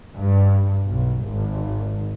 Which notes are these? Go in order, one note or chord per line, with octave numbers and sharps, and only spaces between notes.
G2
B1
G#1